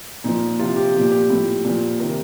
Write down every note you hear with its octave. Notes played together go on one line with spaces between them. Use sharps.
A#2 F3 D#4
C3 F3 F4
G4
A#2 F3 G4
G4
A2 F3
A#2 F3
C3 D#3 A#4